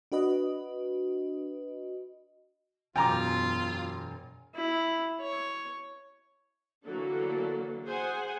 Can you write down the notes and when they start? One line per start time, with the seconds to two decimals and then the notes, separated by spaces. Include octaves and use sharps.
0.12 D4 F#4 B4 D#5
2.96 E1 F#2 B2 F4 G5 G#5 A#5 D6
4.55 E4
5.21 C#5
6.85 D3 E3 F#3 A#3 A4
7.85 G#4 C5 F#5 G#5